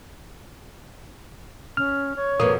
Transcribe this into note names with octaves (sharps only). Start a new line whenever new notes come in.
C#4 F6
C#5
F2 B2 A#3 D#6